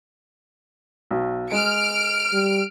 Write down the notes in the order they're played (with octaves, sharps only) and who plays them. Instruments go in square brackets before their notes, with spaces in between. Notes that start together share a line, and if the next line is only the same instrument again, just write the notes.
[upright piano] B1
[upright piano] G#3 [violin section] F6 D7
[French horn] G3